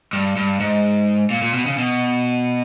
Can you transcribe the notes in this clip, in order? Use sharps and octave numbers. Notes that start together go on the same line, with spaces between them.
G2
G2
G#2
A#2
A#2
B2
C#3
B2